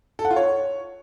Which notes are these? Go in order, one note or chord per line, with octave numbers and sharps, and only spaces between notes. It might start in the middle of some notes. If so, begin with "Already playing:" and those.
A4
F#5
F4
C#5